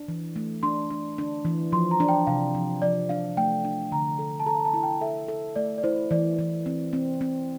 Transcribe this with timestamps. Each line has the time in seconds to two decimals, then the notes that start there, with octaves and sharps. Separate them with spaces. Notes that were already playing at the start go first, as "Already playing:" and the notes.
Already playing: D4
0.08 E3
0.36 A3
0.63 D4 C6
0.90 D4
1.18 D4
1.45 E3
1.72 F3 C6
1.91 A#5
2.00 D4
2.09 G5
2.27 C3 F5
2.55 F3
2.82 F3 D5
3.09 D4 F5
3.37 A3 G5
3.65 D4
3.92 D3 A#5
4.19 A4
4.40 A5
4.46 A4 A#5
4.65 A5
4.74 E4
4.83 G5
5.01 A4 E5
5.28 A4
5.56 A3 D5
5.78 D5
5.83 E4 C5
6.11 E3 D5
6.39 E3
6.66 C4
6.93 C4
7.21 C4